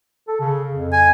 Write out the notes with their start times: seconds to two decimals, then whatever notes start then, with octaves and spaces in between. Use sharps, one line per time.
0.28 A4
0.40 C#3
0.73 F2
0.93 G#5